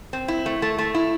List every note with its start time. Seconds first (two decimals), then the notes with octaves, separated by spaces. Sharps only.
0.13 C4
0.28 E4
0.46 A3
0.62 A3
0.79 A3
0.95 E4